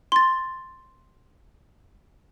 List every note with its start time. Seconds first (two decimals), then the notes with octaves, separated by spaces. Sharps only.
0.12 C6 A6